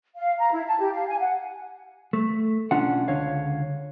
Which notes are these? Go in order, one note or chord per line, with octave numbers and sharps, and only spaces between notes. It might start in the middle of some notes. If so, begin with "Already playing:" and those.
F5
A#5
E4
A5
G4
F5
G#5
F#5
A3
B1 C#4 D4 F4 F#5
C#2 D3 C#5 F5